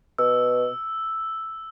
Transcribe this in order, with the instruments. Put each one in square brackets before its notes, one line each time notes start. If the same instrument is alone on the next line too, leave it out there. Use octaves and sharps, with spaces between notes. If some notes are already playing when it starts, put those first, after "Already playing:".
[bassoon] B2 [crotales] E6